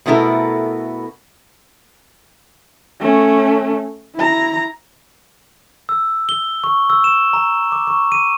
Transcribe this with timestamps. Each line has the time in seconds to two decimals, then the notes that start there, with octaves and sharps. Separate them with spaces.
0.06 B2 A3 B3 E4 A4 A#4
3.00 A3 C#4
4.15 E4 A#5
5.89 E6
6.29 G7
6.64 C#6
6.90 E6
7.04 E7
7.33 A#5
7.72 D6
7.87 C#6
8.12 D#7